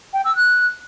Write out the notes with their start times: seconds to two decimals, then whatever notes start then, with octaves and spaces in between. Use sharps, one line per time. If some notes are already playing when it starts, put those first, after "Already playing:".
0.13 G5
0.25 E6
0.36 F#6